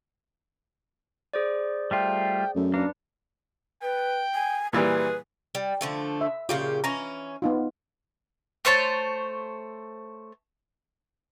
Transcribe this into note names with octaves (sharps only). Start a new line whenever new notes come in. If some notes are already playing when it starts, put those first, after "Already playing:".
G#4 C5 D5
G3 A3 F4 G5
F#2 A3
A#3 D4 B4
B4 G5
G#5
A#2 E3 G3 G#4 B4
G3
D3 F3 A3
E5
A#2 C#3 F4 G4
E3 C#4 A#5
B3 D#4 F4
A3 C5 C#5 A5